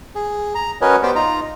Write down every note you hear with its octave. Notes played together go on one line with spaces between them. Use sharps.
G#4
A#5
C#4 F#4 A#4 B4 C#5 D#5
B3 G4 C5 D5 G5
D#4 F4 A#5